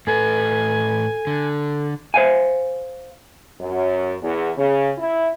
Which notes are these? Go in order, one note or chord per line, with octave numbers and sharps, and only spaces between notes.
A2 A4 B4 G#5
D3
C5 F5 G#5
F#2
E2
C#3
E4